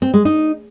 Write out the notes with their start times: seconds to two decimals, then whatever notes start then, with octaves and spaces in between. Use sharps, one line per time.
0.02 C4
0.14 G#3
0.25 D#4